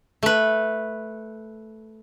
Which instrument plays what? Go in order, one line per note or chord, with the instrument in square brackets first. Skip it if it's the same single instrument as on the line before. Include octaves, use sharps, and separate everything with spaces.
[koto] A3 B4